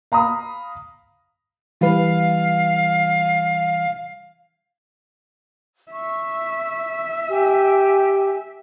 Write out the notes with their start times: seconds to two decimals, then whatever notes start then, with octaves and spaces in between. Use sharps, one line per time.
0.12 F5 A#5 B5 D#6
1.81 E3 G3 B4 F5
5.91 E5 C#6
7.29 G4 G#5